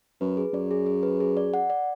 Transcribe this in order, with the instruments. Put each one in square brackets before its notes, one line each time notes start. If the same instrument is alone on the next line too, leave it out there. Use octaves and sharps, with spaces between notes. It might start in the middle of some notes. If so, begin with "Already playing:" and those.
[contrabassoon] F#2 [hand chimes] B4
[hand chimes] G#4
[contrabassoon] F#2 [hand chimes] D5
[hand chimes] G#4
G#4
B4
G#4
D5
F#5
D5